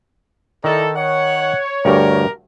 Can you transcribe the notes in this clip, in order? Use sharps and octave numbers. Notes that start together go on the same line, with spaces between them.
D#3 D#4 E4 A4 D5 A#5
C#5 F#5
D2 G2 G3 G4 A#4